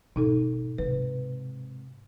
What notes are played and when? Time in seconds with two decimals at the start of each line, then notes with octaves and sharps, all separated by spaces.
0.16 G#1 B2 D#4 A4
0.78 G#2 C3 B4